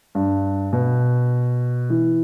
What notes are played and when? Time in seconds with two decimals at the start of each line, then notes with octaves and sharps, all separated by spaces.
0.15 G2
0.73 B2
1.90 E3